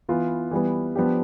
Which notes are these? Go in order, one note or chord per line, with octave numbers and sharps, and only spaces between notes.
E3 B3 F4
E3 G3 B3
F3 B3 D4 G4